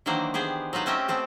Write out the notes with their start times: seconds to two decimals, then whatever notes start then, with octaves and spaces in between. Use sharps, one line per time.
0.06 D#3 E3 F#3 A#3 D4 C5
0.34 B3 G4 G#4 C5
0.73 F#3 D#4 F4 B4 C5
0.86 A3 C4 C#4 G4 D#5 E5
1.08 A3 B3 C4 A4